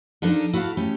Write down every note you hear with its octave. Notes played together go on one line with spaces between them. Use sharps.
F3 D4 D#4 A4 A#4 D#5
E4 F#4 A4 C#5 F5
A3 C#4 G4